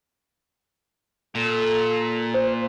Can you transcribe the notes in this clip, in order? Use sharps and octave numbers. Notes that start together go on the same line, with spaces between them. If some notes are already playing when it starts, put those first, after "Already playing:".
A#2 A4
C5